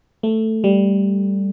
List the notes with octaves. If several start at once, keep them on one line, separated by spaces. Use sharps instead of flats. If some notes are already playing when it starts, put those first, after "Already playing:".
A3
G3